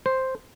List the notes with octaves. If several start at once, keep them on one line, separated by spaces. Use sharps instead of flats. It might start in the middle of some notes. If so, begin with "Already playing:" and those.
C5